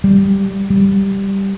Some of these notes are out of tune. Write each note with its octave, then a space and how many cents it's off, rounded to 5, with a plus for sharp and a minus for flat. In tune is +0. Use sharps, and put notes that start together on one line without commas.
G3 +0
G3 +0